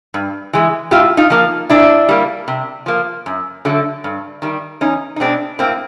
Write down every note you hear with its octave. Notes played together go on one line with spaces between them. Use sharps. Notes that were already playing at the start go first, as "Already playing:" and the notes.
G2
E3 G#3
A2 F4 G4
D#4 F4
F3 A#3
A#2 D4 E4
G3 A#3
C3
F3 A#3
F#2
D3 F#3 A3
G2
D#3 G3
E2 C#4 D#4
D#4
B2 G#3 C4 D4
A2 A#3 C4